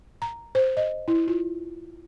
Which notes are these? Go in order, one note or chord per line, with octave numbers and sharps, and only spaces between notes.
A#5
C5
D#5
E4
F4